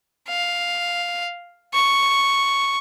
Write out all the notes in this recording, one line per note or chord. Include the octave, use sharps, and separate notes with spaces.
F5
C#6